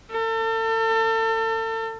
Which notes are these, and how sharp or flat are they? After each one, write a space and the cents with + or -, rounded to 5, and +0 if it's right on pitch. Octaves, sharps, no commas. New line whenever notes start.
A4 +35